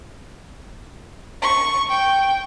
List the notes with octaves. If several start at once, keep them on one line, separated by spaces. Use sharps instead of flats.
C#6
G5